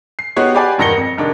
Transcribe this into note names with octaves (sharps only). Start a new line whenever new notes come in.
C7
B3 D#4 F#4 G4 C#5
G4 B4 D5 F#5 G#5
E1 G2 D#3 A#6 C#7 G7
F2
F1 D#3 D4 D#4